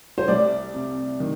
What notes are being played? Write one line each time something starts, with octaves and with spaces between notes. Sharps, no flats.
C5
C2 D5
C3
D#3